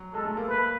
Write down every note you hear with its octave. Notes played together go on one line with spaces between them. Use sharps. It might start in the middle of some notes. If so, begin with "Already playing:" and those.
Already playing: F#3
G#3 A4
A3
A#3
B4